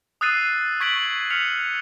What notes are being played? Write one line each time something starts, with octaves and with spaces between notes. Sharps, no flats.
D#6 E6 F#6 A6 C7 D#7
C#6 G#6 B6 D7 F#7
F6 B6 C#7 F7 F#7